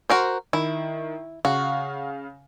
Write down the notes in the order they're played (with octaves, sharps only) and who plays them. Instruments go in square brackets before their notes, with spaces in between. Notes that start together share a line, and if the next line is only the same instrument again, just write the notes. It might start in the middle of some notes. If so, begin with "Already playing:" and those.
[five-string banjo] F#4 A#4 C5
[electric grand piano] D#3 [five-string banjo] E4
[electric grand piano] C#3 F5 [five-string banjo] F#4